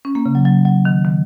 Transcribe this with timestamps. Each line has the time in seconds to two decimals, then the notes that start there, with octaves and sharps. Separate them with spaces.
0.05 C#4
0.15 A#3
0.26 C#3
0.35 F#3
0.45 F#3
0.65 F#3
0.85 D#3
1.05 D#3